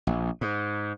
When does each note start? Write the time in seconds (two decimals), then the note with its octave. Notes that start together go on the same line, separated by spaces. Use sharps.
0.07 A#1
0.41 G#2